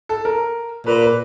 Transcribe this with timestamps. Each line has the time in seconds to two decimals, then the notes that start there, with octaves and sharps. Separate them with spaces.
0.09 A4
0.25 A#4
0.86 A#2 B4
1.02 B4